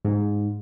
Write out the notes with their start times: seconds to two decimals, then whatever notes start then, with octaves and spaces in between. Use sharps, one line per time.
0.05 G#2